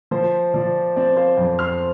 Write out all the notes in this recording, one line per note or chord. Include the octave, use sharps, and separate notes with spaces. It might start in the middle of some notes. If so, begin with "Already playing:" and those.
F3 C5
F3 D5
C4 D5
C5 F5
F2
C6 F6